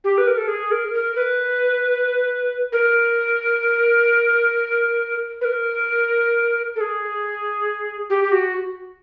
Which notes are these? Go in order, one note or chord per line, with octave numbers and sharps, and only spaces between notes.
G4
B4
A#4
A4
G#4
A#4
A#4
B4
A#4
B4
A#4
A4
G#4
G4
G4
F#4